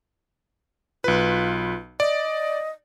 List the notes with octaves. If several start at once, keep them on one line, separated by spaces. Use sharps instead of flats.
B1 F4 B4
D5 D#5